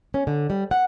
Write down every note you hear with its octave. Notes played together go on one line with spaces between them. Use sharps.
C#4
D3
G3
F#5